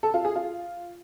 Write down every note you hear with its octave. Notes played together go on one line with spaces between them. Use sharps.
A4
F4
G#4
F4